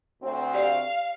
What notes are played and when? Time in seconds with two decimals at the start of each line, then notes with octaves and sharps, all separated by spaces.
0.22 D2 C4
0.54 G4 D5 F5